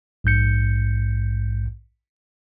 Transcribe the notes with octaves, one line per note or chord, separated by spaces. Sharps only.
A#1 G#2 G6 C#7